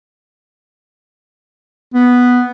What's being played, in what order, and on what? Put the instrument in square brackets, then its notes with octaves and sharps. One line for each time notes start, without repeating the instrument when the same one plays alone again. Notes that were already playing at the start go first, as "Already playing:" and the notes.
[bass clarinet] B3